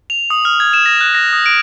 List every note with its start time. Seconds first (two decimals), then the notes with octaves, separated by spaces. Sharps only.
0.10 F7
0.30 D#6
0.45 F6
0.60 G#6
0.73 E7
0.86 A#6
1.01 F#6
1.15 A#6
1.33 D#6
1.46 D7